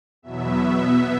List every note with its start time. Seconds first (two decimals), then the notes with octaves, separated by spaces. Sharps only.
0.22 E2 B2 F#3 B3 E5
0.60 B2 B3 E5